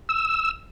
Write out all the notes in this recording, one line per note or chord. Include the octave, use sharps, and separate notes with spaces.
E6